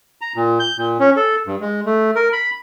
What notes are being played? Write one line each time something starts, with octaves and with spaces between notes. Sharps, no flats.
A#5
A#2
G6
A#2
C#4
A4
G2
G#3
A3
A#4
B5